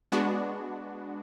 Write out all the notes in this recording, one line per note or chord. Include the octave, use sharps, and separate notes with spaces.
G#3 B3 D4 F#4